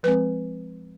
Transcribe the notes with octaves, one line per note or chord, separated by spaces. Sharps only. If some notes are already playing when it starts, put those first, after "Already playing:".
F3 G#3 C4 B4